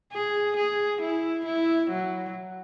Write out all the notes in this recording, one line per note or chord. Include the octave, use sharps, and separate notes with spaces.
G#4
G#4
E4
E4
F#3